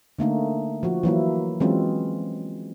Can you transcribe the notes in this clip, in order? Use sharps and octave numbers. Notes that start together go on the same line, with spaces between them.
D3 A3 A#3 D#4
F3 F#4
E3 F#3 A#3 E4
E3 F#3 G#3 C4 C#4 F4